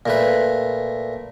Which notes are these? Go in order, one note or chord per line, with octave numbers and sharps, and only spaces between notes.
A#2 A3 B4